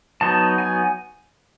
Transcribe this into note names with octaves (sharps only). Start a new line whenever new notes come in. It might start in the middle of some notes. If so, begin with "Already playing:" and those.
F#3 B3 D#4 A5
G#5